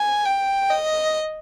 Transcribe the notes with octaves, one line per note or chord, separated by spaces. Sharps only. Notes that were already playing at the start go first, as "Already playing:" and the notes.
Already playing: G#5
G5
D#5